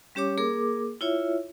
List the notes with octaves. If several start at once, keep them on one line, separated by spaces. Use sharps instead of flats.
G3 C#4 G4 C#5 D6
A#3 G#4 A#4 D6
E4 F4 C#5 E5